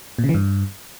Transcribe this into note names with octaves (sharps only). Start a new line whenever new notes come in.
A#2
C#3
E3
G2